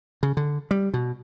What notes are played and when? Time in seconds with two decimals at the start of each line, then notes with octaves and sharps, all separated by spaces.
0.23 C#3
0.37 D3
0.71 G3
0.94 B2